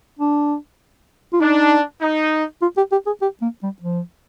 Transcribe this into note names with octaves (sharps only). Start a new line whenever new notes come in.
D4
F4
D4 D#4
D#4
F4
G4
G4
G#4
G4
A#3
G3
F3